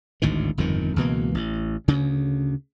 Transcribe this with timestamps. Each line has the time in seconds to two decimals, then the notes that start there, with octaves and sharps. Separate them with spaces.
0.22 G#1 D2 A2 D#3
0.58 G1 F2 G#2 D#3
0.96 C#2 B2 E3 A#3
1.35 A1
1.88 D2 C#3